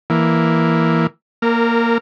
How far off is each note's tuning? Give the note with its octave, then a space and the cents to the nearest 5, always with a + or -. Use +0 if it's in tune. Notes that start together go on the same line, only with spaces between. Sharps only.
E3 +0 A#3 +0
A#3 +0 A#4 -25